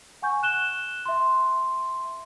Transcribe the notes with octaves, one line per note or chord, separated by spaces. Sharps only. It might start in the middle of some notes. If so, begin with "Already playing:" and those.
F#5 G#5 C#6 G6
F#6 E7 G7
E5 C6